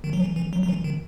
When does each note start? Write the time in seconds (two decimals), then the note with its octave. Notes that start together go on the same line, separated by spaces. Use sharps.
0.04 D#3
0.13 F#3
0.20 E3
0.36 E3
0.53 F#3
0.63 F#3
0.69 E3
0.84 D#3